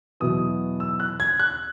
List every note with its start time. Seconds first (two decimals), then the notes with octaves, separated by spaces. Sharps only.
0.20 E2 B2 F#3 B3 E4 D#6
0.80 E6
1.00 F#6
1.20 G#6
1.40 F#6